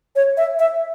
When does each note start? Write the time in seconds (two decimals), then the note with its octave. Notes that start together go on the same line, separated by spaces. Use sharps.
0.16 C#5
0.37 E5
0.59 E5